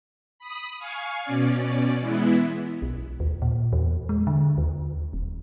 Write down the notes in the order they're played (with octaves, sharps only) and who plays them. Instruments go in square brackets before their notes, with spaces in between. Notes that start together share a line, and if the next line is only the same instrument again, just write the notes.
[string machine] B5 D#6
F5 G#5 C#6
B2 C#4 D5
E3 G#3 B3 E4
[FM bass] B1
D#2
A#2
E2
G#3
D3
D#2
E1